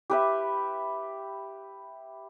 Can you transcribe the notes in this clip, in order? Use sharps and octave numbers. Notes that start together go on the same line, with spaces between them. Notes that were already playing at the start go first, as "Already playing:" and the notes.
G4 B4 E5